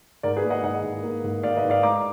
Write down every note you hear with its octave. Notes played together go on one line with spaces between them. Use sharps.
G#2 A#4 D5
G#4 B4
A#3
D#5 F#5
G#2 D#5 F#5
G#2
A#3
G#2
A#3 D5 F5
B4 D#5
G#2
D5 F5
G#3 A#5 D6